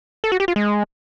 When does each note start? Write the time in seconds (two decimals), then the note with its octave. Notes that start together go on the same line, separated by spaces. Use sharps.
0.24 A4
0.32 F#4
0.40 G4
0.48 F4
0.56 G#3